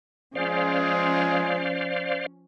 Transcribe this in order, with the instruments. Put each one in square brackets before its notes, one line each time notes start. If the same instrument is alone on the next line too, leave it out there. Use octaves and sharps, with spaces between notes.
[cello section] F3 C#4 [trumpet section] G#3 F4 G#4 [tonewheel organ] C5 D5 F5